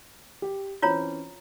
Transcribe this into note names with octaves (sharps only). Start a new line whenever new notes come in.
G4
E3 C4 C#4 F4 C#5 A#5